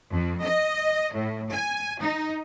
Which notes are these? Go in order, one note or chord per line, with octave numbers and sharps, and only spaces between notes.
F2
D#5
A2
G#5
D#4